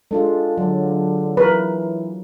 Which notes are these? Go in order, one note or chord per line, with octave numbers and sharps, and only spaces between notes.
G#3 D4 F4 A4
D3 F#3
E3 A#4 B4